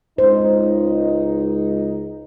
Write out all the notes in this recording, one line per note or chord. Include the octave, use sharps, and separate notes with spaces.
C#2 D#4 C5